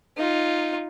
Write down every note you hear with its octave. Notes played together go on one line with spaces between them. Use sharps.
D#4 F4